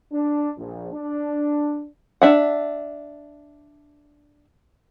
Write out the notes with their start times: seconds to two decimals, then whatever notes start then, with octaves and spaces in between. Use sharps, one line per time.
0.12 D4
0.58 A#1
0.93 D4
2.22 D4 E5 F#5